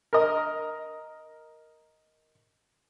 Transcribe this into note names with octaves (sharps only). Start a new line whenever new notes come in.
A#4 D#5